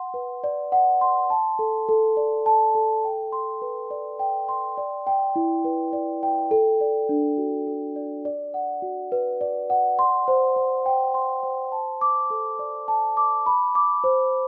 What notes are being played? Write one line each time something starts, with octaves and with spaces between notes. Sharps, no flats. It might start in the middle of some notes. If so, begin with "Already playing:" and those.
Already playing: F#5 C6
B4
D5
F#5
C6
A5
A4
A4
D5
A5
A4
G5
C6
B4
D5
G5
C6
D5
G5
E4
B4
D5
G5
A4
D5
D4
F#4
A4
D5
D5
F#5
F#4
B4
D5
F#5
C6
C5
C5
G5
C6
C5
A5
D6
A4
D5
A5
D6
B5
D6
C5